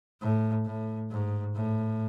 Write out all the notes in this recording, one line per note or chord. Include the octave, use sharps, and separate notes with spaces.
A2
A2
G#2
A2